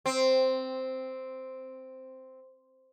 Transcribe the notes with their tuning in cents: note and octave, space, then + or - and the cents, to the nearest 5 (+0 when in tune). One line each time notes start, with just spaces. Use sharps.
C4 -5